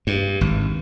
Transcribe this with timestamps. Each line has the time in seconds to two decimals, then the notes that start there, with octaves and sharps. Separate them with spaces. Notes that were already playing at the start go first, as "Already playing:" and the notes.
0.07 G2
0.41 G#1